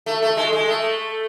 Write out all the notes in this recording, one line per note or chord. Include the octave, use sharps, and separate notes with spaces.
A3
A3
G#3
G#3
A3